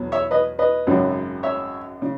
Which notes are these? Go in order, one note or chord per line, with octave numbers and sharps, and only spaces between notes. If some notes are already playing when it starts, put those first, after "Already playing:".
Already playing: E2 B2 F#3
C#5 E5
B4 D#5
B4 D#5
G#1 F#2 C#3 F#3
C#5 E5
C#3